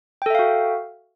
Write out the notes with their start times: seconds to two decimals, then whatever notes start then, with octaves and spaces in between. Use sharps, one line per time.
0.22 G5
0.26 A4
0.30 E5
0.35 F5
0.39 F#4